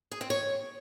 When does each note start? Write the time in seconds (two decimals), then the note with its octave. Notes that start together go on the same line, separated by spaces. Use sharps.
0.11 G#4
0.21 C4
0.30 C#5